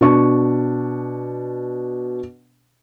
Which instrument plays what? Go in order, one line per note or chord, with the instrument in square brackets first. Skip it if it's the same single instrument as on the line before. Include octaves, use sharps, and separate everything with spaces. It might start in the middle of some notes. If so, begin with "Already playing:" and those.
[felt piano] B2 D4 C#6